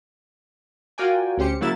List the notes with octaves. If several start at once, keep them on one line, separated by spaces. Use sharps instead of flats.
F4 F#4 A#4 D5 G5 G#5
D2 C#4 G4 C5 C#7
C#3 F#3 A#3 E4 A6 E7